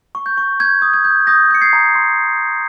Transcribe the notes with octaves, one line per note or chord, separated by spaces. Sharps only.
C#6
G6
C#6
G6 G#6
D#6
G#6
G6
D#6 G6 A#6
G6 C#7
G#6 C7
A#5
C6